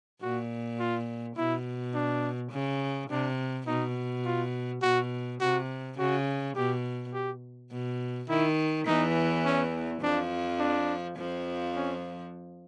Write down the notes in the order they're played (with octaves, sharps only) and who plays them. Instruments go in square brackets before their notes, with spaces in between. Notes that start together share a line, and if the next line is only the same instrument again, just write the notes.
[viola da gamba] A#2 [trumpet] F#4
[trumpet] F4
[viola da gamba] B2 [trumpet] E4
[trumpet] D4
[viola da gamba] C#3
[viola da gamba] C3 [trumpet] D4
[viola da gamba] B2 [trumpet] D#4
[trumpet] F4
[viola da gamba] B2 [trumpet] F#4
[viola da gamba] C3 [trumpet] F#4
[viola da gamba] C#3 [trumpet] F#4
[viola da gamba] B2 [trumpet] G4
[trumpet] G4
[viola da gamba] B2
[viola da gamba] D#3 [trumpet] E4
[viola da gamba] E2 E3 [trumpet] D#4
[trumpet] C#4
[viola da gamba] F2 F3 [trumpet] D4
[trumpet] D4
[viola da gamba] F2 F3
[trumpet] C#4